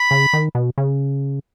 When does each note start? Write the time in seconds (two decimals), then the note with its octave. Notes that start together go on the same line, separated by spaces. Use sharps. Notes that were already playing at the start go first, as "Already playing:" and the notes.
Already playing: B5
0.11 C#3
0.33 D#3
0.55 B2
0.78 C#3